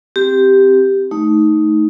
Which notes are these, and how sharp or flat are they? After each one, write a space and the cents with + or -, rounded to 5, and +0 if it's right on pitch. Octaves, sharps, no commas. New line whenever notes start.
C4 +0 G4 +0
A3 -5 D#4 +10